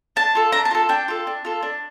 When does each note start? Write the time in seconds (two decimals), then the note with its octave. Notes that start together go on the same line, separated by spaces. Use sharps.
0.16 D4 A5
0.35 F4 A4
0.52 D4 A#5
0.65 A5
0.71 F4 A4
0.89 D4 G5
1.08 F4 A4
1.27 D4
1.45 F4 A4
1.63 D4